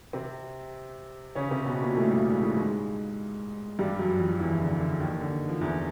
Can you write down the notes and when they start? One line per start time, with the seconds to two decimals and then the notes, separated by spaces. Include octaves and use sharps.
0.13 C3 C4
1.35 C#3 C#4
1.51 C3 C4
1.66 B2 B3
1.81 A#2 A#3
1.96 A2 A3
2.11 G2 G3
2.30 G#3
2.42 A2 A3
2.57 G#2 G#3
3.79 G2 G3
3.99 F#2 F#3
4.19 F2 F3
4.39 E2 E3
4.60 D3
4.80 D3
5.00 D#2 D#3
5.21 D3
5.49 F3
5.61 E2 E3